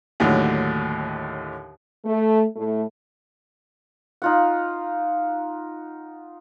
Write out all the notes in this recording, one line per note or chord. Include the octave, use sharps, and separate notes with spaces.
D#2 A2 D3 F#3
A3
A2 A3
D#4 F4 F#5